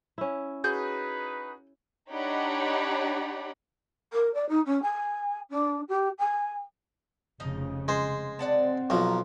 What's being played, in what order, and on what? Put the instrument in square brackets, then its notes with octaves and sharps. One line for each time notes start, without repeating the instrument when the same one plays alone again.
[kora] C#4 E4
[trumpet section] D#4 B4 [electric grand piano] F#4 G#4 [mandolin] G6
[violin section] D4 D#4 G4 C#5 F#5 B5
[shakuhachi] A#4
D5
D#4
C#4
G#5
D4
G4
G#5
[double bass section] F1 C#3 [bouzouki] F3 D#4 D#5
[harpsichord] G#3 C5
[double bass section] C4 [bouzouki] D5 F#5 A5
[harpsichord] B1 F3 [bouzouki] F#3 A#5